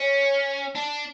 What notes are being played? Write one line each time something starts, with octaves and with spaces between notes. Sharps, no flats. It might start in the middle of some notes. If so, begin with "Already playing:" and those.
Already playing: C#4
D4